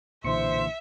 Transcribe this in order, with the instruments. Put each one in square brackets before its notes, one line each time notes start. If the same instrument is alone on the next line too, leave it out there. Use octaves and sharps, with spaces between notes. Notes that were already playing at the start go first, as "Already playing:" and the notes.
[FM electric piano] B1 C#7 [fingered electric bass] A#2 D3 E3 [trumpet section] C5 C6 [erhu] E5